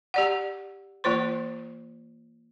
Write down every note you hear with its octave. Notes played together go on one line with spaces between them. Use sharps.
G4 D5 F#5
E3 A#3 F4 C5 C6